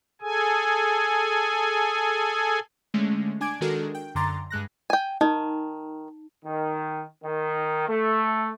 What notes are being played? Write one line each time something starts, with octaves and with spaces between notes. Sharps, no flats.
G#4 A4 G#5
D3 G#3 A3 C#4
D4 G#5 D6 G#6 D7
D#3 G#3 D4 F#4 A4 A#4
G5
F#2 D3 A#5 C6 D6 A6
G2 G#3 F#6 A#6
G5 G#5
D#3 D#4
D#3
D#3
A3